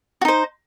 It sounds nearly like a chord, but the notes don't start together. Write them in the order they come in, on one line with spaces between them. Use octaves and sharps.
F#4 D#4 C5